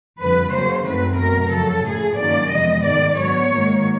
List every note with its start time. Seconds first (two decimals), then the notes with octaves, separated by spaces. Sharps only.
0.20 F2 D3 G3 B4
0.53 C#3 F#3 A#3 C#4 C5
0.86 F#2 D#3 F#3 A3 C4 B4
1.18 B2 F#3 A3 A#4
1.52 F2 C#3 F#3 A4
1.85 A2 F3 A3 G#4
2.18 G2 D#3 F#3 A#3 C#4 D5
2.51 F2 C3 E3 G#3 B3 D#5
2.84 G#2 D#3 G#3 D5
3.17 D3 F#3 B3 C#5
3.51 G#2 D#3 F#3 A#3